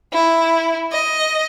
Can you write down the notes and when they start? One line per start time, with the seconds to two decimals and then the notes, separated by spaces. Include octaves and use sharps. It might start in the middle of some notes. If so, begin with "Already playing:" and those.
0.13 E4
0.93 D#5